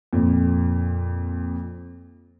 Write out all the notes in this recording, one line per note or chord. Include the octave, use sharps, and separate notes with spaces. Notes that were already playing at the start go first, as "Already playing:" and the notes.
F2 A#2